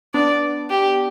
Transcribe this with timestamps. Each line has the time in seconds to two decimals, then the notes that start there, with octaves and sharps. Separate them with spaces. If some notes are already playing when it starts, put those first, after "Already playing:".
0.14 B3 D4 D5
0.70 G4